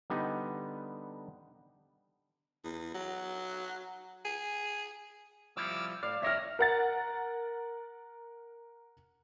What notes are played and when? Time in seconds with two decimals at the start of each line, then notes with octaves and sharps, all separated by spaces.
0.10 D3 G3 B3 D#4
2.64 E2
2.94 F#3
4.25 G#4
5.57 F3 G3 E4 D6 E6 F6
6.03 A2 D5 F5
6.22 D#2 A#4 C#5 E5 F6
6.59 A#4 F#5 A6